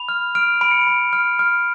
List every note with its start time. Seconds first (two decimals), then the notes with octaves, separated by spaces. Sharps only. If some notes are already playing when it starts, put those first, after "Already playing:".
Already playing: B5 F7
0.09 F6
0.35 F6 D7
0.61 B5 D7
0.71 C#7
0.81 D7
0.87 B5
1.13 F6
1.39 F6